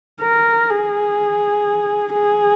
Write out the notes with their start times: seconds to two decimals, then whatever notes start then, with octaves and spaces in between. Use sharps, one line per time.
0.22 A#4
0.70 G#4
2.13 G#4